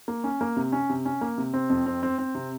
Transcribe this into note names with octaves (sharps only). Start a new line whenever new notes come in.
A#3
C#4
A#3
C3
C#4
C3
C#4
A#3
C3
C4
F2
C4
C4
C4
C3